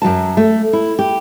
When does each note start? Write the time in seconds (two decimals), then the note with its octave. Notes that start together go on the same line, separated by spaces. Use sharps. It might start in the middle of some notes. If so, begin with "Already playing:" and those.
0.02 F#2 F#3 F#4 A5
0.37 A3
0.73 E4
0.99 G4